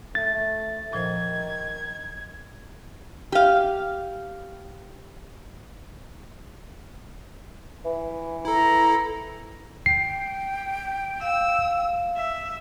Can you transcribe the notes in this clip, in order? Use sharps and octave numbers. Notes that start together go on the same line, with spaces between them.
A3 A6
A#2 D#3 F3 C5 G#6
G4 F5
E3
E4 A4 A#5
G5 C7
F5 E6
E5